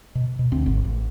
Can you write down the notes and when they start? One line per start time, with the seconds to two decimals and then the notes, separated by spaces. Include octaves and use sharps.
0.15 B2
0.39 B2
0.52 D2 C4
0.66 G#1
0.85 A1